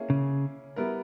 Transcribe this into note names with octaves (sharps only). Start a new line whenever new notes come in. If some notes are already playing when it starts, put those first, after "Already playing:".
Already playing: A#3 C#4 E4 G#4
C#3
G3 B3 E4 A#4